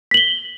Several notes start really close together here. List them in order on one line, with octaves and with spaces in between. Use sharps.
B6 F#7 G7